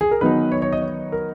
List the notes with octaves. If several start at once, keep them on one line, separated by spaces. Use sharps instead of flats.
G#4
A#4
D#3 F#3 B3 D#4 B4
C#5
C#5
D#5
C#5
A#4